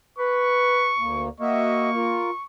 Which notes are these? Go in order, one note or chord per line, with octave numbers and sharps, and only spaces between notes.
B4 C#6
D2 A#3
A#3 F#4 D#5 E5 C#6
F4 A#4